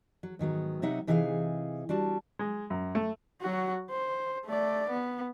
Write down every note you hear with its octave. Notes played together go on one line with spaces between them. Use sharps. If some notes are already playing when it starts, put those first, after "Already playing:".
F#3
G#2 D#3 F#3 B3
C3 F#3 D#4 E5 F#5
C3 E3 D#4 G#4 D#5 F5
G3 D4 F#4 A5
G#3
F#2
A3
F#3 F#4
C5
A3 D5
B3